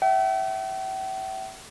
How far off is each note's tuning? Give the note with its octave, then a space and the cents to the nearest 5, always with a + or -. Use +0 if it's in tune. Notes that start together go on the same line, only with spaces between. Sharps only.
E5 +0 G5 -45